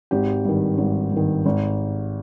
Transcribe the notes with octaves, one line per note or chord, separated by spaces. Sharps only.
G#1 G4
G2 D#3
G#1
G2 D#3
G#1